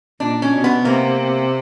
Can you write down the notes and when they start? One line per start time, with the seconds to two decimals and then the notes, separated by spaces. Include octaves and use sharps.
0.20 A#2 D4
0.42 C#4
0.53 B2
0.64 B3
0.85 C3 A#3